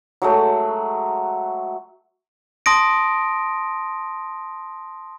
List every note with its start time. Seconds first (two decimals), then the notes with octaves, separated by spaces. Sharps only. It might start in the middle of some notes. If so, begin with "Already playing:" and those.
0.22 F#3 G#3 A3
2.66 A5 C6 D#6 A#6 D7